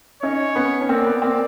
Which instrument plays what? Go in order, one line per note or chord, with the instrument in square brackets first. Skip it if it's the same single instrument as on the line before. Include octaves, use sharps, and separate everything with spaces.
[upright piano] C#4 D#4 [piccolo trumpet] C#5
[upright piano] B3 C#4
C#4
[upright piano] A#3 C4 [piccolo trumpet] D5
[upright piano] B3
A#3 C4